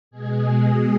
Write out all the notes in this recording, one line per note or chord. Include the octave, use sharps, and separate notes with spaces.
B2 G#3 G#4